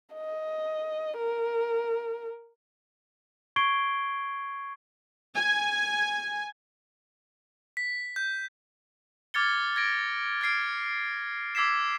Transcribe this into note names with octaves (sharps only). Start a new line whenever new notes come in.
D#5
A#4
C#6 G#6 C7 D7 G7
G#5
B6
G6
D6 F6 G#6 A6 C#7 G7
G#6 A#6 D7
F6 G#6 C7 D7
D6 E6 G#6 B6 C7 E7